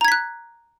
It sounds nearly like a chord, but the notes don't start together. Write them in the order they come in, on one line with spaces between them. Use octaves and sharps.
A#5 G#6 B6 F#6